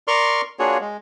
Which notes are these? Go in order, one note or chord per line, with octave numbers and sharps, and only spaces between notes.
A#4 D5 C6 C#6 F6
A#3 D4 F4 F#4 G#4 C#5
G#3